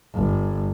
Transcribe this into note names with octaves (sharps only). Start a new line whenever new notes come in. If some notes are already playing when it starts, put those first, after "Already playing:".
G1